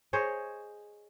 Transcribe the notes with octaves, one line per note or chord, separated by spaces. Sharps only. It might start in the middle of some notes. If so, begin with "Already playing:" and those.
G#4 C5 C#5 D#5